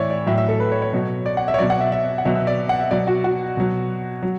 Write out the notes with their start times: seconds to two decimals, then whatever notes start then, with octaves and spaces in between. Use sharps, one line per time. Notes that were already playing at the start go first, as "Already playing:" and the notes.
Already playing: A2 E3 C#5 D5 E5
0.10 D5
0.26 A2 F#3 E5
0.38 E5
0.48 A4
0.60 B4
0.72 C#5
0.82 C#5
0.93 B2 F#3
1.26 D5
1.37 F#5
1.48 E5
1.54 C#5
1.58 B2 F#3 D5
1.70 F#5
1.80 E5
1.92 E5
2.18 F#5
2.25 B2 F#3 E5
2.35 E5
2.47 D5
2.69 F#5
2.80 E5
2.91 B2 F#3 D5
3.07 F#4
3.24 F#4
3.57 B2 F#3
4.23 F#3